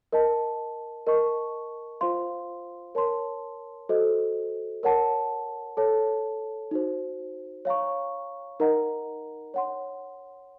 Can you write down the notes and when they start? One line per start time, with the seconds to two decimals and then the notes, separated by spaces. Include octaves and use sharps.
0.12 A#4 D#5 A5
1.07 A#4 D#5 A5 C#6
2.01 F4 C5 F5 C6
2.95 A#4 C#5 A5 C6
3.89 F#4 A4 C5 D#5
4.83 A#4 C#5 F#5 A5
5.77 A4 C#5 A5
6.71 D#4 F#4 C5
7.65 C#5 F5 A#5 C#6
8.60 D#4 A#4 D#5 F#5 A#5
9.54 C#5 F#5 C6